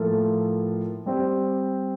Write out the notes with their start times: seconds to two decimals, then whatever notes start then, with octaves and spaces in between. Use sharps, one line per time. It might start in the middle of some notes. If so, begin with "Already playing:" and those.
Already playing: A2 F3 A#3 F4 A4
1.06 G3 C4 G4 C5